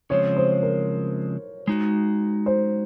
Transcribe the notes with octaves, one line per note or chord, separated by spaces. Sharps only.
C#3 F3 G#3 C4 C#5
C5
A#4
G#3 D#4 F#4
C5